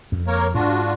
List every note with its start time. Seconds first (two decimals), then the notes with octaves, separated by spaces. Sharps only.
0.12 F2
0.27 A#3 A#4 C#5
0.55 G#2 D4 F4 F#4